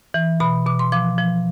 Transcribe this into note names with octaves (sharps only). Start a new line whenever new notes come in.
E3
B2 B5
B2 D6
C6
F3 D6
F3